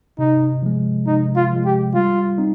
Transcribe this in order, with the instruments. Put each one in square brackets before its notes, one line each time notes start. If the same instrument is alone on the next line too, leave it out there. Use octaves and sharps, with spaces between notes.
[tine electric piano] C3 [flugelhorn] D#4
[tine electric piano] F3 G#3
[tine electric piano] C3 [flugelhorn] D#4
[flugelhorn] F4
[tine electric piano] F3 G#3
[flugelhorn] G4
[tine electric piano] G3 [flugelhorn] F4
[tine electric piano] C4 D#4